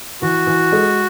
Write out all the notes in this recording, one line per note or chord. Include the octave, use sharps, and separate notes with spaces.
E3 F#4
E3
G#3